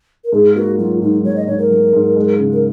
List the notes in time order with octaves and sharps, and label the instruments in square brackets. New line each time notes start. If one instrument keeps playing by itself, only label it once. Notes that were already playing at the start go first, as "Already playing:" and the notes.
[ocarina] A#4
[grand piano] G#2 [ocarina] G#4
[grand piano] A#3 [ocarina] F#4
[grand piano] F#3 [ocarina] F4
[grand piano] G#2 [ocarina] D#4
[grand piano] F#3 [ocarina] C#5
[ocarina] D#5
[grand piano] G#2 [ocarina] C#5
[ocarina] A#4
[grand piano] F#3
G#2
G#3
C#3
[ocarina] A#4